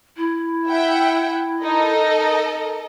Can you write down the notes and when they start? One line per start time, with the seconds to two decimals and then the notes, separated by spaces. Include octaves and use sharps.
0.17 E4
0.68 E5 F#5 G5
1.64 D#4 A4 A#4 D#5